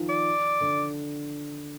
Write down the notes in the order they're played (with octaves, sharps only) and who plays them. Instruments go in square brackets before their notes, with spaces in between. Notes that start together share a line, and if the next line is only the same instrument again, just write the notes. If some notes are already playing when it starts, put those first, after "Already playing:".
Already playing: [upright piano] D#3 F3
[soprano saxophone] D5
[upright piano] D3